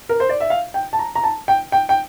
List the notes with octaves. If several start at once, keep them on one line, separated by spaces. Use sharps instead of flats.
A#4
C5
D5
E5
F5
G5
A5
A#5
A#5
A5
G5
G5
G5